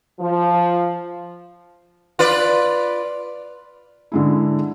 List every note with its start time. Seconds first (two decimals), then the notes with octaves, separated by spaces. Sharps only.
0.20 F3
2.19 F4 B4 D5
4.12 D3 G#3 E4